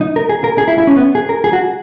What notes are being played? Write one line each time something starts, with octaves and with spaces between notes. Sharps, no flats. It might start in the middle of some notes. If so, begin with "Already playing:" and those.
D#4
A#4
G#4
A#4
G#4
E4
E4
C#4
B3
G#4
A#4
G#4
F#4